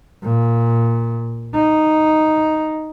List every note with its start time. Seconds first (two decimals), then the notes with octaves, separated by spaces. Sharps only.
0.23 A#2
1.55 D#4